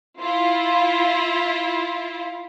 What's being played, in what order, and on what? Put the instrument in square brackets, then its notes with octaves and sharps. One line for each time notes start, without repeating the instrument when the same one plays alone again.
[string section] E4 F4